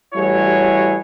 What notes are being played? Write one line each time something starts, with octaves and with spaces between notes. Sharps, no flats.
A1 G3 E4 F#4 G#4 C#5